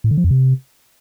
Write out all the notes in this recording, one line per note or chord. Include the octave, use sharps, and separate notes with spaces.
A2
D3
F3
F2
C3